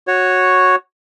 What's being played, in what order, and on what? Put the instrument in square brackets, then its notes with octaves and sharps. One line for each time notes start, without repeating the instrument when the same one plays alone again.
[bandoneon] F#4 C#5